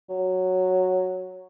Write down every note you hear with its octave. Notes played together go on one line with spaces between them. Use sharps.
F#3